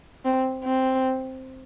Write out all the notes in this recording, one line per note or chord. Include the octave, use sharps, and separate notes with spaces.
C4
C4